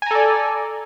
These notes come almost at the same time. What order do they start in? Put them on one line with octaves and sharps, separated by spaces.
G#5 A#5 A4 D5